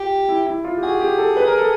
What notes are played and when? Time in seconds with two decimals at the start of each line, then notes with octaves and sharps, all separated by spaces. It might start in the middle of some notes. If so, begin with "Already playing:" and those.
Already playing: F4 G4
0.29 E4
0.46 E4
0.64 F4
0.77 G4
0.82 F#4 G#4
1.01 G4
1.18 A4
1.37 B4
1.47 A#4
1.58 A4